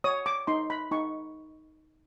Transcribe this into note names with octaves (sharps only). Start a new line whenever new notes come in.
C#5 D#6
D6
D#4 C6
B5
D#4 C#6